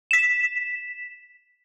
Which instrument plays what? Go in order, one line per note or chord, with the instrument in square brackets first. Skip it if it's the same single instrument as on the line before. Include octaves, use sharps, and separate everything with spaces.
[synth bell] B6 E7